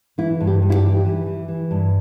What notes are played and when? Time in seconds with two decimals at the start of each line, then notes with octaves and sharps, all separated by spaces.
0.18 E3 E4
0.41 G2
0.47 G4
0.62 G2
0.70 E4
0.75 G4
0.83 E3
1.05 E3
1.26 E3
1.48 E3
1.71 G2